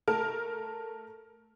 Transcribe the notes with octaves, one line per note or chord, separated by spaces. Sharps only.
A3 A#4 A5 F6